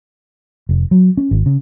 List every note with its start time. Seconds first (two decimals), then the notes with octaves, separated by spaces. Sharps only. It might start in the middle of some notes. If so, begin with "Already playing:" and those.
0.69 F1
0.91 F#3
1.17 C#4
1.31 G#1
1.46 C#3